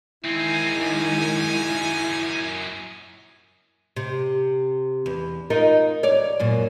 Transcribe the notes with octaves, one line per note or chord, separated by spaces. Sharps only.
E2 D#3 G#3 C4 C#4 D#4 E4 G#5
F#2 A#2
C3
E2
D#4 F4 A#4
C#5 D5
F#2 A#2